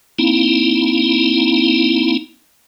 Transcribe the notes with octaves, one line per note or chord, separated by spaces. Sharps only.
A#3 C4 D#4 E4